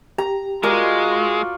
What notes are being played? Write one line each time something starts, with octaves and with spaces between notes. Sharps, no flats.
G4 A#5
G#3 F4 F#4 A#4 D5